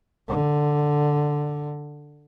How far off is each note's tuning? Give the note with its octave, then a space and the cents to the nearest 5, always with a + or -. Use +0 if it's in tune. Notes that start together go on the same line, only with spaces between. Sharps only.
D3 +5